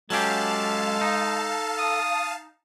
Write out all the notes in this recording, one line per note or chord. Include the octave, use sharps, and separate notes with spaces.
F#3 G#3 C#4 G4 A4 F5 A5
D#4
D#6